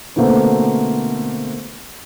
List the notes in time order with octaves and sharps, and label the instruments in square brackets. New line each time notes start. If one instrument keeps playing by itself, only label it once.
[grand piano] B2 D3 A3 A#3 C4